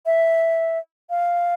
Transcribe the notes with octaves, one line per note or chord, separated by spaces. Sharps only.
E5
F5